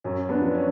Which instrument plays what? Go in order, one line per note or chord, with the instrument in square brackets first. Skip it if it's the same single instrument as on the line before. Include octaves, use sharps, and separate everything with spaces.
[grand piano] F#2 C#4
B3 D4
F3
C#4